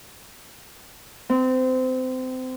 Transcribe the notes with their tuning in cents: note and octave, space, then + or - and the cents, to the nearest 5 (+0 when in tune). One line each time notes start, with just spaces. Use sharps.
C4 -25